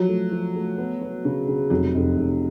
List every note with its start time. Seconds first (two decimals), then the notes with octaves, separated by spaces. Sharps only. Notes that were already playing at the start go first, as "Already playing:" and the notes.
Already playing: F3 F#3
0.09 A3
0.32 F3
0.55 A3
0.78 B3
1.01 B3
1.25 C#3
1.48 C#3
1.70 F1 F#3
1.94 F1
2.17 F1